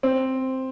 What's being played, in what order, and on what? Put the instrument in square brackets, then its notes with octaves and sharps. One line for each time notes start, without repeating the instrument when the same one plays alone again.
[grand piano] C4